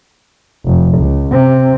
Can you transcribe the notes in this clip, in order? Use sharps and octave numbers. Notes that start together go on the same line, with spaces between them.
F1
C#2
C3 C4